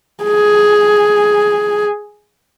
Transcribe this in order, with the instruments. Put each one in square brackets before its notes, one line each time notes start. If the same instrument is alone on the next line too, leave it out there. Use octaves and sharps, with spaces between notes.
[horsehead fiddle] G#4